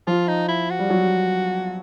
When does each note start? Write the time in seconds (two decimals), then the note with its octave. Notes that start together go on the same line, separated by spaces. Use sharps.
0.07 F3 F4
0.28 D#4
0.48 E4
0.70 F#4
0.79 G3
0.90 F#3